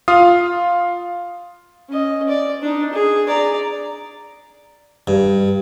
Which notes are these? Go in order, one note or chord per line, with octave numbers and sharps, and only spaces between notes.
F4 F5 D#6
C#4 D#5
D5
D4 D#4
G#4
D5 A#5
G2